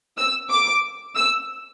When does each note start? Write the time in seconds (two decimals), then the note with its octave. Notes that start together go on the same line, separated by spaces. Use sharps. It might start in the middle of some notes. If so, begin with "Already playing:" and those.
0.17 E6
0.50 D6
1.16 E6